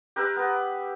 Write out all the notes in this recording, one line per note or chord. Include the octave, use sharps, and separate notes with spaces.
G4 A#4 B4 E5
B3 B4